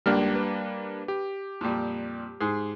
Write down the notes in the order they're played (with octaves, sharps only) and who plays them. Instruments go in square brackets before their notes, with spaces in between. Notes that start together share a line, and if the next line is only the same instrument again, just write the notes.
[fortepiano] C#2 F6 [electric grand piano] G3 A#3 D4
[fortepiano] B4
[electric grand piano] G4
[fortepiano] F2 A#2 G3
G#2 G#4